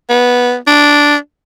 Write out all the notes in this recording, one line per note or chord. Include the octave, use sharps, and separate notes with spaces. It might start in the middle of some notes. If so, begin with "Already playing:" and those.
B3
D4